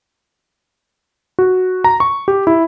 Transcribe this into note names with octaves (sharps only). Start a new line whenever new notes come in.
F#4
A#5
C#6
G4
E4